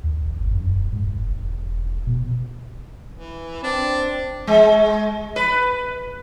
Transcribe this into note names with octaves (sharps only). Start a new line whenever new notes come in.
D#2
G1
F#2
D#1
G#2
F1
E1
B2
E3
C4 D4
G#3
B4